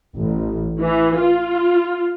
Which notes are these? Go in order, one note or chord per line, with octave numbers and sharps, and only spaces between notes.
A1
E3
F4